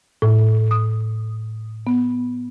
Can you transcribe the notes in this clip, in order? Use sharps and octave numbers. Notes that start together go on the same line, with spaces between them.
A2
D#6
B3